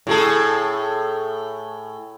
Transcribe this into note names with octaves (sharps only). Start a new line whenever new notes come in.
A2 G#4 A4